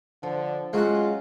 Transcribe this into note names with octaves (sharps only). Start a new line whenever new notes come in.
D3 F3
F#3 G#3 C#4 F4 F#4 F#5